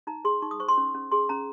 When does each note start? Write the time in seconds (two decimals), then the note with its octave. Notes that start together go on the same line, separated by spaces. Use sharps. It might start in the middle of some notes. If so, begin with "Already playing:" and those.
0.07 D#4 A#5
0.25 G#4 C6
0.42 D#4 C#6
0.51 D#6
0.60 C5 C#6
0.69 C6
0.78 C#4
0.95 C#4
1.12 G#4 C6
1.29 C#4 A#5